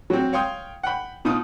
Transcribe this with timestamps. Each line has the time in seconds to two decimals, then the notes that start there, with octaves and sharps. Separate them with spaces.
0.10 F#3 C4
0.33 C#5 F5 G5 C6 D#6
0.83 F#5 G5 B5
1.25 B2 D#4 F4 D#6